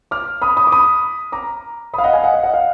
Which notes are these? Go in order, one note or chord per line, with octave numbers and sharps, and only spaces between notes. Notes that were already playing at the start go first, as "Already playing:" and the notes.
D6 F6
B5 D#6
B5 D#6
D6
B5 D#6
A#5 D6
B5 D#6
F5
D#5 F#5
F5 G#5
D#5 F#5
F5
D#5 F#5
F5